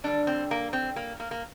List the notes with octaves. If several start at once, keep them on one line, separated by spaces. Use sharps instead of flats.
D3 G3 D4
C4
A#3
C4
A#3
A#3
A#3